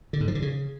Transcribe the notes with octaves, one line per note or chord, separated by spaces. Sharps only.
D3
G#2
F3
D3
C#3